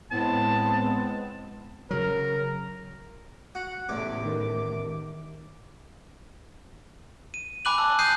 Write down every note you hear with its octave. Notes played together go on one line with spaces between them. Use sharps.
A2 G#3 B3 C4 A5
C#3 F#3 A#4
F#4 F#5
A1 E2 A2 C3 D6
D#3
D#7
G#5 B5 D6 F#6 D#7 F#7
A5 E6
D#6 F#6 G6 C7 D#7